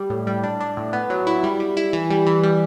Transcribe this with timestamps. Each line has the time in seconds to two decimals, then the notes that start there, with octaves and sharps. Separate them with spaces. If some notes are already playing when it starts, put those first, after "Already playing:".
Already playing: G3
0.10 A2
0.27 G3
0.43 D4
0.60 D4
0.77 A2
0.93 B3
1.10 F#3
1.27 E4
1.43 G3
1.60 G3
1.77 E4
1.93 E3
2.10 G3
2.27 E3
2.43 G3